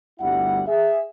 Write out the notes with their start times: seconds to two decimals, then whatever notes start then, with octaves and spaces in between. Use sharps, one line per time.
0.20 G1 D2 G3 E4 F#5
0.67 G#4 E5